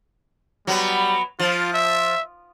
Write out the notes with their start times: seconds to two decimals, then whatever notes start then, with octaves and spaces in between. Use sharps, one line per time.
0.67 F#3 G3 B3
1.39 F3 F4
1.73 E5